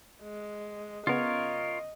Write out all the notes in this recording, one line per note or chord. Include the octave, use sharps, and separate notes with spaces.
G#3
C#3 B3 F4 A#4 C#5 D#5